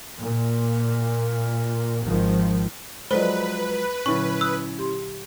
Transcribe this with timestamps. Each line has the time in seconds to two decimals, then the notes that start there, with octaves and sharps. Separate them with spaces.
0.20 A#2
2.03 G#1 D#3 F3
3.11 F3 F#3 G#3 A4 B4 C5 D5 D#5
4.06 A#2 D3 F#3 C#4 E4 C#6
4.41 B5 D#6 E6 F#6
4.79 G4 C6